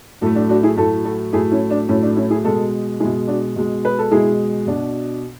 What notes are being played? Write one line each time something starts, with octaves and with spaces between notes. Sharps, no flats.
A2 F#3 A3 F#4 A4
D4 F#4
D4 F#4
E4 G#4
A2 F#3 A3 F#4 A4
F#4 A4
A2 F#3 A3 E4 G#4
C#4 E4
D4
A2 F#3 A3 C#4
D4
C#4 E4
E4 G#4
B2 G#3 F#4 A4
B2 G#3 E4 G#4
D4 F#4
B2 G#3
B4
A4
B2 G#3 E4 G#4
B2 D4 F#4